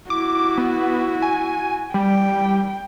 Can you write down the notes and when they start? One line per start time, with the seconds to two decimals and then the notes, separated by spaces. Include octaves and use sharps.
0.10 E4 F#4 D6
0.58 B3
1.22 G#5
1.94 G3 G5